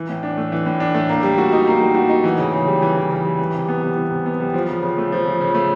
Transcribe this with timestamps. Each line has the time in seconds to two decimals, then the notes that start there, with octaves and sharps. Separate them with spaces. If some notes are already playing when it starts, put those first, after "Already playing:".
Already playing: E3
0.09 A2
0.23 D4
0.37 A3
0.52 E3
0.66 A2
0.80 D4
0.94 A3
1.09 A#3
1.23 G3
1.38 F#4
1.52 D#4
1.67 A#3
1.81 G3
1.95 F#4
2.09 D#4
2.24 E3
2.38 C#3
2.52 C#3
2.67 G3
2.82 E3
2.96 C#3
3.11 C#3
3.25 G3
3.39 E3
3.54 C3
3.68 B3
3.82 G3
3.96 E3
4.11 C3
4.26 B3
4.40 G3
4.54 F3
4.68 C#3
4.83 C#3
4.98 A3
5.12 F3
5.26 C#3
5.41 C#3
5.55 A3